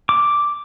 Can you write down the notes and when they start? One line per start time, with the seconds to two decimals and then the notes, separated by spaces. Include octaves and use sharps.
0.09 D6